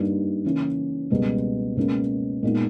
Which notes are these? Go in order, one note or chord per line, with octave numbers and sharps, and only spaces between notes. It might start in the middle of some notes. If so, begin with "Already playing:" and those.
Already playing: G2 G3 A#3 D#4
C#3 E3 A#3 C#4 E4
C#2 B2 G3 A#3
C#2 B2 A#3 C#4
A#2 G#3 B3 D#4